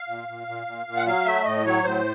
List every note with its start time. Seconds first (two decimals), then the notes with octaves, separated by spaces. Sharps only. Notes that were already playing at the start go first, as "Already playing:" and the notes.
Already playing: F5
0.08 A#2
0.28 A#2
0.47 A#2
0.67 A#2
0.86 A#2
0.97 F#5
1.06 F#3 F5
1.25 A3 E5
1.45 A2 D#5
1.65 F#3 C#5
1.84 A2 C5